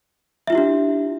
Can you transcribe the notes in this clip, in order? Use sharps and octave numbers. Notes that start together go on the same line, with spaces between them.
D4 E4 F4 G4 E5